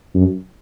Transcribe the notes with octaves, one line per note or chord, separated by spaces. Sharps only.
F#2